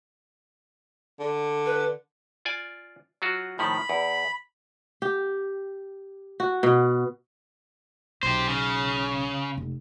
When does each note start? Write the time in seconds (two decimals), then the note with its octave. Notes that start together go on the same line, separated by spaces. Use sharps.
1.20 D3
1.66 B4
2.45 F4 D5 G#5
3.22 F#3 F4 F#4
3.59 A2 D#3 F3 B5
3.89 E2
5.02 G4
6.40 F#4
6.63 B2
8.23 B1 G4 C5
8.48 C#3
9.57 F1